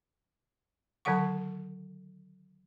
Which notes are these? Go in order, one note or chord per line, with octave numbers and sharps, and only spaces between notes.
D3 D#3 F#3 A4 F#5 C#6